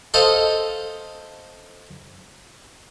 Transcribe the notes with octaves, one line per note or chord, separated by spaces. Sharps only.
A4 C5 D#5 F5